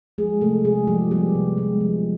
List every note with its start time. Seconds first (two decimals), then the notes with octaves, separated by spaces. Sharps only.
0.18 F3 G#3 G#4
0.41 C3 A3 A4
0.64 C3 G#3 G#4
0.87 F3 G3 G4
1.11 G3 B3 G4
1.35 C3
1.57 G#3
1.81 F3